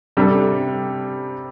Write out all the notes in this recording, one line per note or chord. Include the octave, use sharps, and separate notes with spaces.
C3 G3 D4 A4